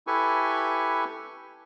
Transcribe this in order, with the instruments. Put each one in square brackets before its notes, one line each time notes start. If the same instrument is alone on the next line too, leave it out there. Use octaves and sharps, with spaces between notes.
[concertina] E4 G4 A4 B4 G#5 C#6